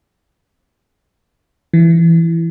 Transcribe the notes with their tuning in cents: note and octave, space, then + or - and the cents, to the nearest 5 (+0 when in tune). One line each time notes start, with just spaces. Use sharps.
E3 +10